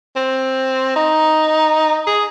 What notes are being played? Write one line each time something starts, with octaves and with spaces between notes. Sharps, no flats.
C4
D#4
G#4